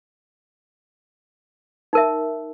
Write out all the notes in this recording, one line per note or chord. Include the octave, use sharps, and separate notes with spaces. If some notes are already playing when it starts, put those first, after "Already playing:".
D#4 A#4 E5